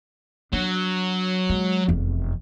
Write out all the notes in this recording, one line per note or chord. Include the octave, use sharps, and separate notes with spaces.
F#3 D4
G#3
F1 E2